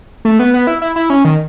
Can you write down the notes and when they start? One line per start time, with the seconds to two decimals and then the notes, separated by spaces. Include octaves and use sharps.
0.25 A3
0.39 B3
0.54 B3
0.67 E4
0.82 E4
0.96 E4
1.10 C#4
1.25 D#3